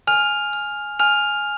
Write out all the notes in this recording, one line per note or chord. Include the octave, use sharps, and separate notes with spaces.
G#5 F6 F7
F6
G#5 F6 F7